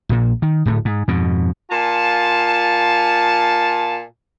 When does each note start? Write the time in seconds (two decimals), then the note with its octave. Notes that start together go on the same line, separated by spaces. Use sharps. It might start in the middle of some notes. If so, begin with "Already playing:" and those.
0.09 A#1 A#2
0.42 D#3
0.65 D1 A2 A3
0.85 G#2
1.08 F2 G#2 B2
1.70 A#2 F4 G#5 A5